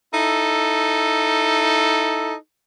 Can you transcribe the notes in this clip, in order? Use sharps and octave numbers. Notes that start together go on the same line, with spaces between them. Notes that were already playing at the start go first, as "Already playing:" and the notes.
D#4 E4 A4